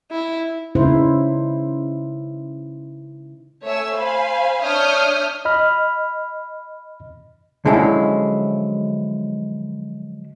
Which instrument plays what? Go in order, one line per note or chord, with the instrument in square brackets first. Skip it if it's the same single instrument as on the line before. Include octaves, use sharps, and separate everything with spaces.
[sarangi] E4
[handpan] C#3 D#4 E4 C5
[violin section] A3 C#5 E5 G#5 E6
C5 F5 G#5 B5
D4 C#5 E5 D#6 F6 G6
[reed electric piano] D#5 B5 F6
[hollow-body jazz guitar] D3 F3 F#3 G#3 C#4 E4